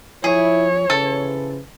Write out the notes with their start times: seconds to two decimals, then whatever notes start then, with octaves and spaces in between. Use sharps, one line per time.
0.24 F3 E4 G#4 C#5
0.90 C#3 E3 F3 A4 B4